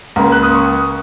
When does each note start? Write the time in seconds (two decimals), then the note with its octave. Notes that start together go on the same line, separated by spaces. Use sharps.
0.16 C#2 C#3 A#3 A#5
0.32 F#6
0.43 D#6
0.55 C#6